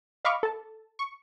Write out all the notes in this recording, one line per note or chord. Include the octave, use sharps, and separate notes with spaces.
D#5 F5 B5 C#6 D6 F6
A4 A5
C#6